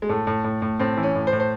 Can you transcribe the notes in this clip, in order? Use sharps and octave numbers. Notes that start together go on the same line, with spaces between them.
G#3
A2 A3
A2
A2
A2
A2 C4
E3
C#4
A2
C5
A2
C5